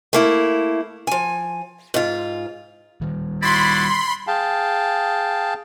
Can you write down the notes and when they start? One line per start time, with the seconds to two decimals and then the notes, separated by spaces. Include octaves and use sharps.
0.13 A3 A#3 E4
1.07 F3 G#5
1.94 G#2 F4
3.02 D#3 G3
3.42 E4 F#4 D5 B5 C6
4.27 G#4 F5 G5 A5